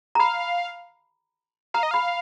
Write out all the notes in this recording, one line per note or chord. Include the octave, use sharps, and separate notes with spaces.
A#5
F5 B5
F5 A#5
D#5
F5 B5